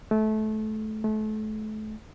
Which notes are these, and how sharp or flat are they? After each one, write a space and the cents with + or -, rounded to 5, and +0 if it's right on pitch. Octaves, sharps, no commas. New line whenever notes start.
A3 -25
A3 -35